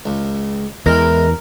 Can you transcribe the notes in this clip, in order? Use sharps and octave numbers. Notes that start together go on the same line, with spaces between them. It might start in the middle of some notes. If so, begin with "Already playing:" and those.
C#2
E2 E3 G#3 A#4